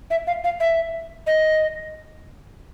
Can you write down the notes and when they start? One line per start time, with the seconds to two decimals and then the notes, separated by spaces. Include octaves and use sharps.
0.10 E5
0.27 F5
0.44 F5
0.60 E5
1.27 D#5